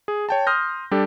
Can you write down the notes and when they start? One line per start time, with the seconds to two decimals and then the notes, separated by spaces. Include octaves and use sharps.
0.08 G#4
0.29 C#5 G5 A5
0.47 C6 D#6 F6 G6 A#6
0.91 G3 D4 G4 A4